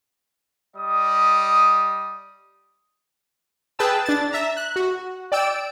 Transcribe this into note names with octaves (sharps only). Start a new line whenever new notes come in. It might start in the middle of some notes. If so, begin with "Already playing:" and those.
G3 D#5 D#6
G#4 B4 G5 A5 E6
D4 A6
E5 A#5
F#6
F#4
D5 G5 E6 D7